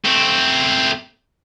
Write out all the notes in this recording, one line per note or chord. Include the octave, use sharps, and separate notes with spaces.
A3 C4